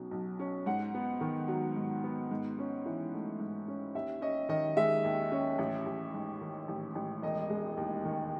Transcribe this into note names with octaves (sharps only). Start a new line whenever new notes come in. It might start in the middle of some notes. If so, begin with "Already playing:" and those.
Already playing: B1 B2 F#3 C#4
B1
C#4
G#2 F#5
B3
D#3
F#3
G#2
B3
G#2
C#4
E3
A3
G#2
C#4
D#2 E5
C#4 D#5
D#3 D#5
G#3 E5
D#2
C#4
A1
A1
G#2
D#3
A1
A1
E1 D#5
G#3
D#2
D#3